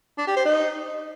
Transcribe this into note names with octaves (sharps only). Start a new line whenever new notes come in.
D4
G4
C5
D#4